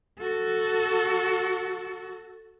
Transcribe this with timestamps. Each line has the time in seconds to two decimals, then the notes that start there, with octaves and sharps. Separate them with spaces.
0.19 F#4 A4